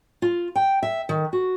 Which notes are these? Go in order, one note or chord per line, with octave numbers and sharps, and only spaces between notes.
F4
G5
E5
D#3
F#4